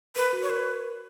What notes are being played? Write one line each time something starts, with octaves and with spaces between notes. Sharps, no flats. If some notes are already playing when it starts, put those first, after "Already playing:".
A#4 B4
F#4
C#5
A#4 B4